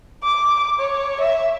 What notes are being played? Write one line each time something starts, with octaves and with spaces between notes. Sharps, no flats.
D6
C#5
E5